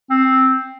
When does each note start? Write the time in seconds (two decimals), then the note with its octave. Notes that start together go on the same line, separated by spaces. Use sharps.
0.10 C4